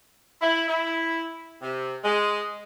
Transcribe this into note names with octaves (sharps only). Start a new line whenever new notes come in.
E4
E4
C3
G#3